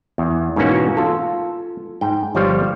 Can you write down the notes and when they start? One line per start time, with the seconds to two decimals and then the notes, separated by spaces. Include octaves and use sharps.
0.18 E2
0.56 G#2 B2 E3 A#3 C#4 F#4
0.97 F4 A4
2.01 G#2 G5
2.35 G1 F3 G3 C5 C#5 F5